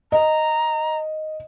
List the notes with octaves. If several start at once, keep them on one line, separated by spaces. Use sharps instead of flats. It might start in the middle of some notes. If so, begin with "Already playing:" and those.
D#5 A#5